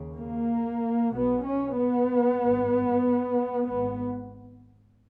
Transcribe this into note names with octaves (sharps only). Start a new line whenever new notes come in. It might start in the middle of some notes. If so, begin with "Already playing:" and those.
Already playing: D#2 C#3
A#3
B1 B2 B3
C#4
B3
G#1 G2
G#1 G#2 B3